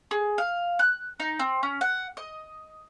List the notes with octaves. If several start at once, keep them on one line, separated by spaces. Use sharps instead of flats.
G#4
F5
F#6
D#4
C4
C#4
F#5
D#5